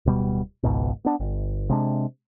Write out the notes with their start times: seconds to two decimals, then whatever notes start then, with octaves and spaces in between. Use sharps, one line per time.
0.06 D1 B2 G3
0.63 G#1 C#2 G#2 B2
1.05 B3 D4
1.20 G1
1.69 C3 G#3 D4